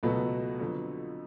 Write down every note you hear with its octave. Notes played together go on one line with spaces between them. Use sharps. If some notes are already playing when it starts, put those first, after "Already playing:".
C#2 B2 F#3 A3 B3
F2 D3 F#3